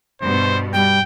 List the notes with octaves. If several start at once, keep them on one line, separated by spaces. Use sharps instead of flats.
G2 B2 C5
G3 G5